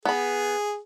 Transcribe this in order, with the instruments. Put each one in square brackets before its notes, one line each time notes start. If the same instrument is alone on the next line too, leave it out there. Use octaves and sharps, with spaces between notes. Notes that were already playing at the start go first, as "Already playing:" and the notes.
[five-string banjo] B3 B5 [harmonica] G#4